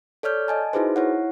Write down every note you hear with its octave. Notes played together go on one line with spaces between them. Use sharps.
A4 C#5 D5 F6 G6
D#5 G#5 A5
D#4 E4 F#4 G#4 B4 C5
E4 C#5 F#5